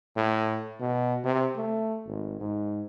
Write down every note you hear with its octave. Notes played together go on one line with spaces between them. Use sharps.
A2
B2
C3
A3
G#1
G#2